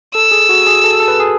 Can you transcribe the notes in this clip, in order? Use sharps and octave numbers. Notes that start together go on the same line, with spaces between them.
A4 E6
G#4
F#4
G#4
A4
A4
B4
G#4